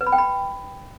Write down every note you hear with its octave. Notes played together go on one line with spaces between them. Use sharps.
B4
B5
G5
B5